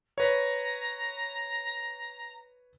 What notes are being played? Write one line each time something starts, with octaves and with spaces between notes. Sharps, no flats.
B4 C#5 A#5